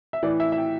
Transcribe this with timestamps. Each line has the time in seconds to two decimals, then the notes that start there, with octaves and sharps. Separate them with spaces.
0.13 E5
0.23 A2 E3 D5
0.40 E5
0.52 E5
0.58 G5